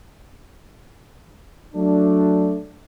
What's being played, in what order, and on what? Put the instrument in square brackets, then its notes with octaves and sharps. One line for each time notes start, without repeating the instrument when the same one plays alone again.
[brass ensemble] F#3 A3 D4